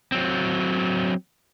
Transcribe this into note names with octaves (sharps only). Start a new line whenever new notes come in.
F#3 C4